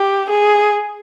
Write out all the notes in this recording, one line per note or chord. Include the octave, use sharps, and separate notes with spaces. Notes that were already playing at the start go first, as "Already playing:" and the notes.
Already playing: G4
G#4